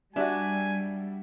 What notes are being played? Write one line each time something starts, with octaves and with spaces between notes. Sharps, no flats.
G3 D4 F#4 G4 E5 G#5